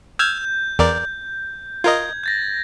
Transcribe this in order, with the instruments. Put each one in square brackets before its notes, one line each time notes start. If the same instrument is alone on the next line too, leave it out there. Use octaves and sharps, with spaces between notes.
[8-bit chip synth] E6 F6 G#6 [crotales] G6
[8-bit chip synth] E2 A#4 D5
[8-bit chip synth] F4 A#4 D#5 [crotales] G#6
[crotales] G6 A6 A#6